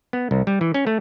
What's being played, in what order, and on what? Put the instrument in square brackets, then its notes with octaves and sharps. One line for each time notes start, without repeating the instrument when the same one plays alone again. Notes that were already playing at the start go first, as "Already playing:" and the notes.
[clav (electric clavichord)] B3
C2
G3
E3
C#4
A3